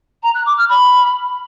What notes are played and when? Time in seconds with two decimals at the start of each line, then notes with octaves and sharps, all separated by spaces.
0.22 A#5
0.34 F#6
0.46 D6
0.57 F6
0.69 B5